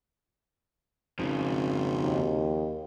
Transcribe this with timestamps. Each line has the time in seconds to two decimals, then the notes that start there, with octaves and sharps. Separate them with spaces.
1.19 G#1 F2 C#3
2.01 D#2